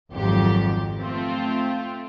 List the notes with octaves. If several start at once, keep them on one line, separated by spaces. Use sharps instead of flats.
G#1 F2 F#3 G4
A3 C4 F4